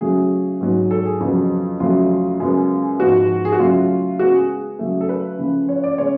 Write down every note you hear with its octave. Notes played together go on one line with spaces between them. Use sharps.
C#3 F#3 A3 G#4
G#2 F#3 B3
A4
G#4
F2 C#3 F#3 B3
F2 C#3 F#3 A3 F4
F#2 C#3 G#3 B3
G#2 F3 B3 F#4
G#4
F#4
C#3 F#3 A3 F4
C#3 G#3 B3 F#4
G#4
C#3 F#3 A3
A4
B4
C#3 F3 A3
C#5
D5
C#3 G#3 B3 C#5